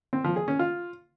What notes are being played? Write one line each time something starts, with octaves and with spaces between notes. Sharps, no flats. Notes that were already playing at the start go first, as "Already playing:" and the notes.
C4
F3
G#4
C#4
F4